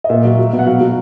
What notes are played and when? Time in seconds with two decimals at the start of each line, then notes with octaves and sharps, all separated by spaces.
0.04 D#5
0.09 A#2 E5
0.25 F#3
0.39 F#3
0.53 B2
0.59 F#5
0.67 F#3 F5
0.81 F#3